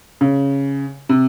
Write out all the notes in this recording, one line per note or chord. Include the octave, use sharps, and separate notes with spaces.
C#3
C3